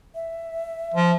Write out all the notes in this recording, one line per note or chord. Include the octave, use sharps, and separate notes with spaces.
E5
F3